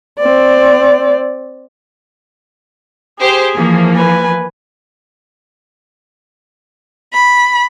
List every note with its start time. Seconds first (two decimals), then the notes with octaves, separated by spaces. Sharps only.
0.19 C4 D5
3.20 G4 G#4 C5
3.55 E3 F3 A#3
3.96 B4 G#5
7.13 B5